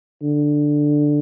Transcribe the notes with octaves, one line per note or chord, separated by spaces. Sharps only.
D3